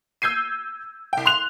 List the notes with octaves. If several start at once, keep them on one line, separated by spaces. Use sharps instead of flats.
E6 G6 G#6 C7 D#7
C2 G5
C6 F#6 F7